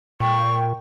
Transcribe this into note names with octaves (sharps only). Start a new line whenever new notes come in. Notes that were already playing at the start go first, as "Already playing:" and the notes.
A#2 G5 C#6